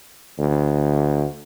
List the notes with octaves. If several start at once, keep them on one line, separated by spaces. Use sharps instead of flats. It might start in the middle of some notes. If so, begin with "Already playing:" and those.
D2